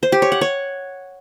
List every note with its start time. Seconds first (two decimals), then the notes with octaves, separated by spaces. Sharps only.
0.03 C5
0.12 G4
0.22 C#5
0.32 F#5
0.41 C#5